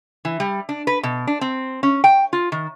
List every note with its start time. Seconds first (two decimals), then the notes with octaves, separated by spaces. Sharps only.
0.25 E3
0.40 G3
0.69 D4
0.87 B4
1.03 B2
1.27 D4
1.41 C4
1.83 C#4
2.04 G5
2.33 F4
2.52 D#3